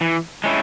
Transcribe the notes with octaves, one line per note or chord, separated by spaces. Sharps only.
E3
G#3 C#4 E4